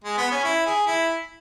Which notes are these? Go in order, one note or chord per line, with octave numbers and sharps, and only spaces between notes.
G#3
B3
C#4
E4
G#4
E4